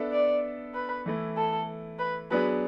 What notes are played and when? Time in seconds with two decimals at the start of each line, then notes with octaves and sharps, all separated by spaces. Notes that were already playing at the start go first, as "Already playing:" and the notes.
Already playing: B3 D4 A4 E5
0.12 D5
0.75 B4
1.06 E3 A3 E4
1.37 A4
1.99 B4
2.31 F#3 B3 D4 G#4 B4